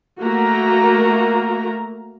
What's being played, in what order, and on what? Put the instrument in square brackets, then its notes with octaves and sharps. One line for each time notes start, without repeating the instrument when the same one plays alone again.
[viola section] A3 A#3 F#4 A#4 A#5